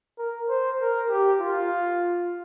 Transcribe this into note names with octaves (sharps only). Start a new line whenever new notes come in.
A#4
C5
A#4
G4
F4